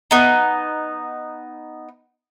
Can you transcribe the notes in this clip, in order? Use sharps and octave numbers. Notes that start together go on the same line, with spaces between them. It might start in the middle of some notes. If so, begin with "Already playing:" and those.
B3 D#4